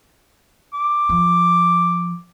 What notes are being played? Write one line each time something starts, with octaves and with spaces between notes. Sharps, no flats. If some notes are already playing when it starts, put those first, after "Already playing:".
D6
F3